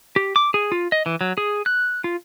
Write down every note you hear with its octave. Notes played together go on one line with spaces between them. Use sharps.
G4
D6
G#4
F4
D#5
E3
F#3
G#4
F#6
F4